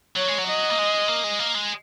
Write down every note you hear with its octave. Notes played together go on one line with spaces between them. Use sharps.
F#3 C#5
G#3
F#3
D#5
A#3
G#3
A#3
G#3
A#3
G#3